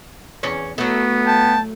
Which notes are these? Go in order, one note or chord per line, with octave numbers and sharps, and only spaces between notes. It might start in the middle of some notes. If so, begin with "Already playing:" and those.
E2 C#4 C#5
F#3 A3 B3
G5 A5